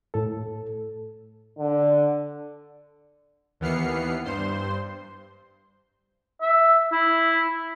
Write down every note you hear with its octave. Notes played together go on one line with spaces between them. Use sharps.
A2 A4
D3
D#2 E3 B3 F6 C7 C#7
G2 C5 C6
E5
E4